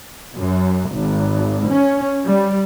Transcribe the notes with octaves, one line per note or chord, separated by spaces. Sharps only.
F#2
G#1
C#4
G3